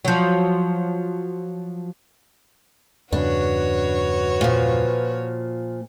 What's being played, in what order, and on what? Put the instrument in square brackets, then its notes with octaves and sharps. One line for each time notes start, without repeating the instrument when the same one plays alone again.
[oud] F3 F#3
[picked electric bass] E2 G2 C#3 [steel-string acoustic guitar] D4 [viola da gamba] F#4 C#5 [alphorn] B4
[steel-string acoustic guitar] A#2 F3